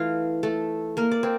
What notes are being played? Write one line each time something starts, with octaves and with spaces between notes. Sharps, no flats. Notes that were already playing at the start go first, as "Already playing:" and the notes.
Already playing: E3 A3 F4 F5
A3 A4
A#3 A#4
D5
C4